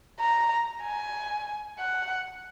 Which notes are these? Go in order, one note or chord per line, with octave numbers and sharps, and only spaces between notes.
A#5
G#5
F#5